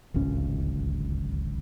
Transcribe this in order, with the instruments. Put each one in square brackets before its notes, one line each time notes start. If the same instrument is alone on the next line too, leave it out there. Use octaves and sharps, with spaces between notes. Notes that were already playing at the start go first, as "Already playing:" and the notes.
[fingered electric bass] D1 G#1 C#2 C#4